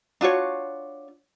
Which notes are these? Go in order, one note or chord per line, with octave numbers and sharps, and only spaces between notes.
D4 F4 F#4 C#5